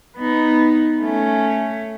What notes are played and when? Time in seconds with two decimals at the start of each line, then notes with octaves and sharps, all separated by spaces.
0.17 B3 D#4
1.00 A3 C#4